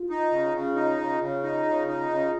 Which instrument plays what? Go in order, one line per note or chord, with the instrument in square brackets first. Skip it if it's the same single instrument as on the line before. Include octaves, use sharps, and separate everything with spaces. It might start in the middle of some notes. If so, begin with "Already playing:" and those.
Already playing: [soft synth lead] F4
[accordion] D#4
C#3
C#3
D#4
C#3
C#3
D#4
C#3
D#4
C#3